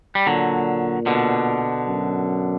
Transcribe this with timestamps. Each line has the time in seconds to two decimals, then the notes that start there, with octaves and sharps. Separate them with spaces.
0.15 G3
0.27 A#2 D3 F#3
1.06 B2 D3
1.87 F#2